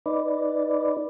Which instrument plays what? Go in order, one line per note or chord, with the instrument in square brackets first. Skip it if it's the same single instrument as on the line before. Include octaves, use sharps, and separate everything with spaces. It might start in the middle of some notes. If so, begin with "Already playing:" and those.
[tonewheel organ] D#4 B4 D5